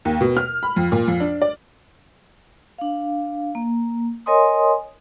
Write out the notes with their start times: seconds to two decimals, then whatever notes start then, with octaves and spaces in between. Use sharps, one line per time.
0.05 D#2
0.21 B2
0.37 F6
0.63 B5
0.76 F2
0.92 A#2
1.08 F2
1.20 D4
1.42 D5
2.78 D4 F5
3.55 A#3
4.26 A#4 C#5 D#5 G#5 C6 D#6